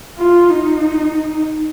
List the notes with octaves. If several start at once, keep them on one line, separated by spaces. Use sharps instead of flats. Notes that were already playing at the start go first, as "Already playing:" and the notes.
F4
D#4